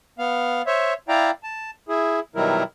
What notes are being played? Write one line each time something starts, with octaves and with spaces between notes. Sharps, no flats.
B3 F5
C5 C#5 E5
E4 D5 F5 G5 A#5
A5
E4 G#4
B2 D#3 F#3 G3 E4 A#4